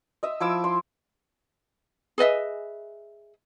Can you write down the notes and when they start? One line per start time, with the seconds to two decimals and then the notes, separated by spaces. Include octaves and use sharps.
0.23 D#5 E5
0.40 F3 E4 D6 E6
0.64 C6
2.18 G#4 B4 D#5 E5